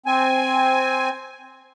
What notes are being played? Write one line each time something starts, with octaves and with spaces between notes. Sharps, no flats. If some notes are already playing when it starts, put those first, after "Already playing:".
C4 G#5